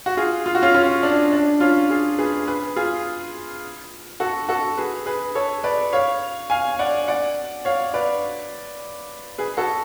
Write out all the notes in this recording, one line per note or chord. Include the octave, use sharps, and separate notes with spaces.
F#4
F4 G#4
F4
F#4
C#4 F4
C#4 F4
D4
D4
C#4 F4
F4 G#4
G#4 B4
G#4 B4
F4 G#4
F#4 A4
F#4 A4
G#4 B4
G#4 B4
A4 C#5
B4 D5
C#5 F5
F5 G#5
D5 F#5
D5 F#5
C#5 F5
B4 D5
G#4 B4
F#4 A4